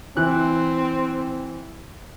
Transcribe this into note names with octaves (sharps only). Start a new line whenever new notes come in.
E3 C4 F#6